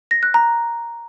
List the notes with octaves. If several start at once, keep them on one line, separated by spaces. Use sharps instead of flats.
A#6
F#6
A#5